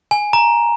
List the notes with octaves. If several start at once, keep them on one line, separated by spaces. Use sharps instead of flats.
G#5
A#5